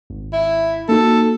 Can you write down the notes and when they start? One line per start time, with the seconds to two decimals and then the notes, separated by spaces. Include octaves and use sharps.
0.10 G#1
0.33 E4
0.89 A#3 D#4 F#4 A4